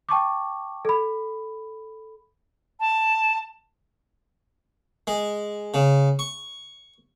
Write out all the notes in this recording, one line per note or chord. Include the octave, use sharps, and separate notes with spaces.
G5 A5 C#6 D6
A4 B5
A5
G#3
C#3
C#6